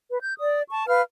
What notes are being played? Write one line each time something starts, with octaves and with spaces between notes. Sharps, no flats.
B4
G6
D5 D#6
A5 C#6
B4 F5 F6